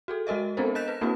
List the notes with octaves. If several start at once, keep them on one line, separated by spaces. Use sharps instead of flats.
F#4 G#4 A4
G#3 F#4 A#4 D#5 E5
B3 C4 D4 A4 A#4 C5
A#4 D#5 F#6 G6 B6 E7
B4
A#3 C4 D4 E4 F#4 B4